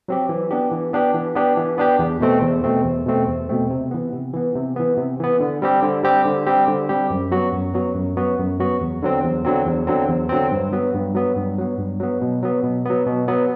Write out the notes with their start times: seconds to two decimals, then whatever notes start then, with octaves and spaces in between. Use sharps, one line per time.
0.08 F#3 C4 G4
0.29 E3
0.51 B3 D4 G4
0.72 E3
0.93 B3 D4 G4
1.14 E3
1.35 B3 D4 G4
1.57 E3
1.78 B3 D4 G4
1.99 E2
2.21 B2 A3 C4
2.42 E2
2.64 B2 A3 C4
2.85 E2
3.06 B2 A3 C4
3.28 E2
3.49 B2 A3 C4
3.70 C3
3.91 E3 B3
4.13 C3
4.33 E3 B3
4.55 C3
4.76 E3 B3
4.97 C3
5.20 E3 B3
5.40 D3
5.62 G3 C4 G4
5.83 D3
6.03 G3 C4 G4
6.25 D3
6.46 G3 C4 G4
6.68 D3
6.89 G3 C4 G4
7.10 F#2
7.31 F#3 B3 F#4
7.53 F#2
7.74 F#3 B3 F#4
7.95 F#2
8.17 F#3 B3 F#4
8.39 F#2
8.60 F#3 B3 F#4
8.81 E2
9.02 D3 F#3 C4
9.24 E2
9.45 D3 F#3 C4
9.66 E2
9.87 D3 F#3 C4
10.09 E2
10.29 D3 F#3 C4
10.52 G2
10.73 F#3 B3
10.94 G2
11.15 F#3 B3
11.36 G2
11.58 F#3 B3
11.78 G2
12.00 F#3 B3
12.21 B2
12.42 F#3 B3
12.64 B2
12.85 F#3 B3
13.06 B2
13.28 F#3 B3